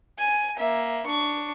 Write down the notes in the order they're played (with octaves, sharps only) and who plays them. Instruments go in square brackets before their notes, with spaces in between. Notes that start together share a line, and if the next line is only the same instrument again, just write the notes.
[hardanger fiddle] G#5
A#3 E5
D4 C#6